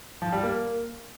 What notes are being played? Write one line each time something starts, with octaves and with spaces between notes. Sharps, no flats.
F3
G3
A#3